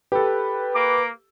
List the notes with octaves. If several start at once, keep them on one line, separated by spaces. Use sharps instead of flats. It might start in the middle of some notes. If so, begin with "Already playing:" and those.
G4 A4 B4
A#3 D6